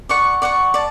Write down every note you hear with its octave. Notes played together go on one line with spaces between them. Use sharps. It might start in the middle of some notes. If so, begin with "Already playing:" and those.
D5 F#5 C#6
D5 F#5 C#6
D5 A5